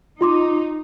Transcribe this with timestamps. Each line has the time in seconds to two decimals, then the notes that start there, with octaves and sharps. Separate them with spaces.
0.21 D#4 F4 C6 D6